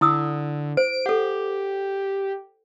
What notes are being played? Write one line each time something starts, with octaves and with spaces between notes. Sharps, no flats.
D3 E4 D#6 E6
C5 D7
G4 A4 F#5